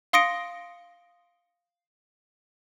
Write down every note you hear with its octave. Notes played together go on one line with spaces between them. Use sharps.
F5 C6 D#6 A#6 C#7 D7